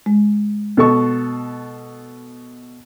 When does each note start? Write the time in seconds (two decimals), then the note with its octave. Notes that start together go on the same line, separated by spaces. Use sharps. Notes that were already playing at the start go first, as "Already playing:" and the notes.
0.06 G#3
0.77 B2 A4 C#6